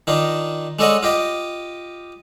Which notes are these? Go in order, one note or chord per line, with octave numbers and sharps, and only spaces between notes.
D#3 D4 D#4 F4
G#3 D4 A4 C#5 D#5 F#5
F4 G4 D#5